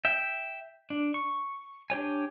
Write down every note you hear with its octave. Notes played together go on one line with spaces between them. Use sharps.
E5 G5
D4
C#6
D4 G4 C#5 G#5